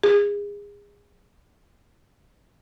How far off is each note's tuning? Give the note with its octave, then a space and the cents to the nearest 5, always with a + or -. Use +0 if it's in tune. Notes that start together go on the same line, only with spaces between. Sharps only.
G#4 -25